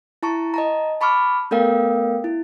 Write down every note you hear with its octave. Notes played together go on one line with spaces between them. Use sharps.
E4 A5 A#5 C#6
D#5 A5 A#5
A5 B5 C#6 D6 F6
A3 B3 A4 A#4 F5 G5
E4